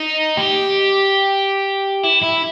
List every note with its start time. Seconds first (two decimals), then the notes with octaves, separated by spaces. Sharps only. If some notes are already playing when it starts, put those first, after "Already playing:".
Already playing: D#4
0.37 G4
2.04 E4
2.23 E4